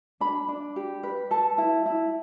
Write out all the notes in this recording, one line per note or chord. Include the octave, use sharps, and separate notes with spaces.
D4 B5
D4
G4
B4
A4 A5
E4
E4